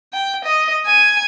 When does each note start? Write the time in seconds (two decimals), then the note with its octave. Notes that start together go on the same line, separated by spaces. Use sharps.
0.13 G5
0.45 D#5
0.86 G#5